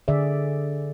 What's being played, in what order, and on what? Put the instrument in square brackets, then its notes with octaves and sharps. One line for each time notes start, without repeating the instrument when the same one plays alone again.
[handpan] D3 G#4 D5 E5